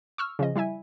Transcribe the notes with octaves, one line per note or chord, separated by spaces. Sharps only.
C#6 E6 F6
C#3 F3 D#5
G3 E4 E5 G#5